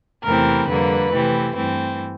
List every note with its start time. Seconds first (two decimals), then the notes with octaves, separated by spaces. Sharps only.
0.24 E2 C3 E3 A3 C4 A#4
0.68 F2 D3 G3 A#3 B4
1.12 C3 E3 A3 C4
1.55 G2 E3 A3 C4